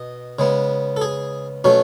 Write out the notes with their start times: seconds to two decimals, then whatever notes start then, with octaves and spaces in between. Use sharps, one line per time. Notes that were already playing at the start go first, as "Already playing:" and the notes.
Already playing: B2 D#5
0.39 C#3 G#3 B3
0.97 A4
1.01 G#4
1.64 B2 F#3 A3 C#4